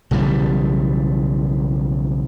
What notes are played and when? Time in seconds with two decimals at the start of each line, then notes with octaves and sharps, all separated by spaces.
0.11 B1 C#3 E3 G3